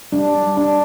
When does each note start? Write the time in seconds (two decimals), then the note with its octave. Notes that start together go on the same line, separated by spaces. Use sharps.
0.12 G3 D4
0.43 G3
0.57 D4